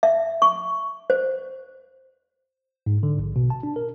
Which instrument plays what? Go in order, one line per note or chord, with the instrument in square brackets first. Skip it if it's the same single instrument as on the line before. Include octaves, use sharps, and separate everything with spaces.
[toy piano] E5
C#6
C5
[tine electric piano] G#2
D3
A#1
B2
A5
D4
A#4